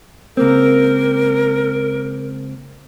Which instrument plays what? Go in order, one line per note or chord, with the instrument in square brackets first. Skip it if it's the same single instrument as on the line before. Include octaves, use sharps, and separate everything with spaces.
[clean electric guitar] C#2 A#3 C4 [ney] A#4